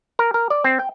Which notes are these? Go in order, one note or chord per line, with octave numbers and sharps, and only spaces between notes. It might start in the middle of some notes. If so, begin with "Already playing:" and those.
A#4
A#4
D5
C4
G5